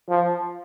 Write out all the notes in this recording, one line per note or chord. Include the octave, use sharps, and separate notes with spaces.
F3